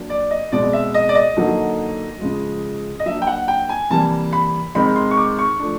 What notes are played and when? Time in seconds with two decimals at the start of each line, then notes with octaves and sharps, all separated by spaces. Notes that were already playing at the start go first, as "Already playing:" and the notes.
Already playing: F#3 A#3 D4
0.10 D5
0.31 D#5
0.52 B2 G#3 C4 D5
0.73 E5
0.94 D#5
1.09 D5
1.15 D#5
1.37 D3 F#3 A#3 D#4
2.21 C#3 F3 G#3
3.00 D#5
3.06 F#3 A#3 D4 E5
3.22 G5
3.27 F#5
3.48 G5
3.69 G#5
3.90 C3 E3 G3 A#3 A5
4.33 B5
4.75 C3 D#3 G#3 C4 D#4 B5
4.96 C6
5.11 C#6
5.17 D6
5.39 C#6
5.59 F3 A3 D4